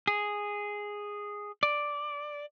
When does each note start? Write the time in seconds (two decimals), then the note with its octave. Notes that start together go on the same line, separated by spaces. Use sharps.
0.07 G#4
1.63 D5